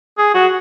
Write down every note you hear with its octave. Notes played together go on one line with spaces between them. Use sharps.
G#4
F#4